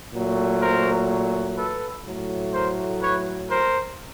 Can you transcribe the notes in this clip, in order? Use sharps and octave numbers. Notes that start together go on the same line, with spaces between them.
A#2 F#3 A3
A#4 C5
A4 B4
A2 F#3 A3
A#4 C5
B4 C#5
A#4 C5